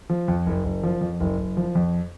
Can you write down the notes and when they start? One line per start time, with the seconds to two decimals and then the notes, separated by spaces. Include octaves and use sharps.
0.10 F3
0.28 F2
0.46 F#1
0.64 F#1
0.83 F3
1.01 F2
1.20 F#1
1.38 F#1
1.57 F3
1.75 F2